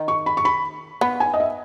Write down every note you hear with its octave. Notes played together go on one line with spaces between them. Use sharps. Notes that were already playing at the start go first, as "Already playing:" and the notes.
Already playing: D#3
C#6
B5
C#6
B5
B3 B5
G#5
D#5
E5